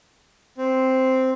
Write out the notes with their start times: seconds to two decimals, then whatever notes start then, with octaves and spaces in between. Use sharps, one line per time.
0.58 C4